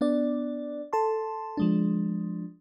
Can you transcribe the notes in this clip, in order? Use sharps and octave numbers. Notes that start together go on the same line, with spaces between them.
B3 D4 D5
A4 A5 C6
F3 G#3 D4